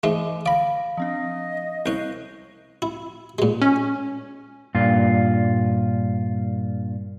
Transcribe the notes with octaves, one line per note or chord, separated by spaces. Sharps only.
G#2 E3 G#3 A3 D#5 G7
D3 D5 F5 B5 A#6
F3 C4 D4 D#5
C2 C#4 F#6 G6 C7
E4
A#2 G#3
C#4
G2 A#2 F4